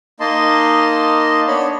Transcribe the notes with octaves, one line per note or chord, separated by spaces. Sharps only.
A#3 D#4 D#5 A5 C6
B3 D4 C#5 B5